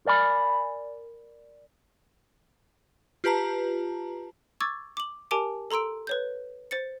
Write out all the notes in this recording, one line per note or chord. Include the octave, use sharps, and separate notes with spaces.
A#4 D5 G#5 B5
F4 G4 B4 A5 A#5
C#6 D6 E6 G#6 A6
D6 F#7
G4 A#4 G#5 A5 D6 D7
A4 A#5 C6 E6 D7
B4 C#5 G6
C5 A6 C#7